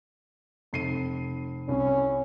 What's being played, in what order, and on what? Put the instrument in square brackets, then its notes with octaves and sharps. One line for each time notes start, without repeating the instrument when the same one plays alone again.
[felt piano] F1 C7 D#7
[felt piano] C2 [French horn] C#4